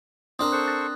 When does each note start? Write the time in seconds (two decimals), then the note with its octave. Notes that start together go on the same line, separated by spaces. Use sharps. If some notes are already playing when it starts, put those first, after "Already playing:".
0.39 C4 D4 A#4 D#6
0.52 A4 C5 C#6 F#6
0.67 F#6 A6 A#6